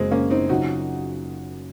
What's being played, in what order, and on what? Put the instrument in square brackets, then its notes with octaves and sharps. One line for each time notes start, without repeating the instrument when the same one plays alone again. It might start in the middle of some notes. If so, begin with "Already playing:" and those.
Already playing: [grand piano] F#1 F#2 C#3 [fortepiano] G#3 A#3 C4
[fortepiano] A#3 C#4
C4 D#4
[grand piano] C#3 F#3 C#4 F4 [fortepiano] D#4 F#4